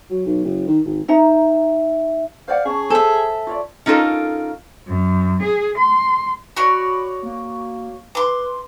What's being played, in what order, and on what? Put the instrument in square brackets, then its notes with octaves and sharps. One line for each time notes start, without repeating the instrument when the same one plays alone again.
[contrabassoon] F#3
B1
F#1
D#3
G#1
[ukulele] D#4 F#5 A#5 [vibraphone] E5
[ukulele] C5 D5 F#5 [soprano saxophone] F5
[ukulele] C#4 C#5 A5 [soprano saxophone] G#4
[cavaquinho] A4 E5 [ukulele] C5 G#5
[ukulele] F4 C#5 D5
[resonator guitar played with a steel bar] C#4 D#4 F4 A4 A#4
[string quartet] F#2
G#4
C6
[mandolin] F#4 C#5 D5 [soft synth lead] B5
[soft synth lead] A#3
[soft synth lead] B4 [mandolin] C6 D6